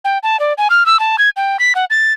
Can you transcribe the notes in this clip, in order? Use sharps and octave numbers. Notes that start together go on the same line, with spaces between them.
G5
A5
D5
G#5
F6
E6
A5
G#6
G5
B6
F#5
A6